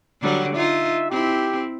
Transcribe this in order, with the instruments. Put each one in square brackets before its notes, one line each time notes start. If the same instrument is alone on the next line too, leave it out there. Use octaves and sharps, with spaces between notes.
[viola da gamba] D3 F#3 G3
[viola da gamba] D#4 F4 [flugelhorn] E5
[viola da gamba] C4 E4 [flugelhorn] G4